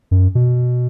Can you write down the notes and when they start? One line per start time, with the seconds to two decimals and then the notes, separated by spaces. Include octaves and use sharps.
0.11 F#2
0.35 B2